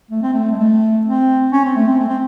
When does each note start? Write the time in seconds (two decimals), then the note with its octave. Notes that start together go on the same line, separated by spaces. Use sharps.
0.11 A3
0.22 C4
0.34 A3
0.52 G#3
0.59 A3
1.05 C4
1.52 C#4
1.65 C4
1.75 A3
1.87 C4
2.00 A3
2.08 C4